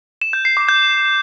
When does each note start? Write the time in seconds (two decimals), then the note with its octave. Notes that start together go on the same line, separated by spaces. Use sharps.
0.22 E7
0.33 G6
0.45 C7
0.57 D6
0.69 G6